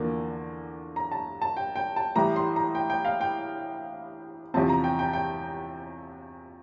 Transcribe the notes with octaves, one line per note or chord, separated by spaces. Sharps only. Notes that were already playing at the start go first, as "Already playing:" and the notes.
Already playing: E2 D3 F3 A#3
A#5
A5
A5
G5
G5
A5
A2 E3 G3 A#5
C6
A#5
G5
G5
F5
G5
E2 C3 F3 C4 A5
A#5
G5
G5
G5